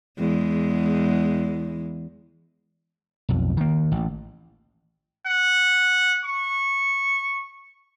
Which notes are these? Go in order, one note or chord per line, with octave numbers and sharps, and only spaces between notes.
E2 G#3
B1 F2
D#3 A#3
A1
F#5
C#6